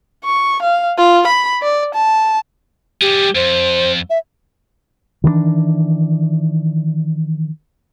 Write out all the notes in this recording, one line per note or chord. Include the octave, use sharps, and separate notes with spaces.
C#6
F5
F4
B5
D5
A5
G3 G4 G#4
F2 C5
E5
D#3 E3 G#3 D4